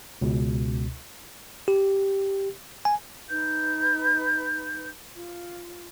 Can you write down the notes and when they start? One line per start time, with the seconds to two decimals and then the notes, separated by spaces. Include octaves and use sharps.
0.21 C#2 B2
1.68 G4
2.85 G#5
3.30 D#4 B4 G6
5.15 F4